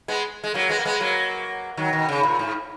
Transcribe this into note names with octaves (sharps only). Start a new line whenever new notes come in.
G#3 B3
G#3
F#3 A#3
G#3 B3
A#3
G#3 B3
F#3 A#3
D#3 F#3
B2 D#3
C#3
A#2
G#2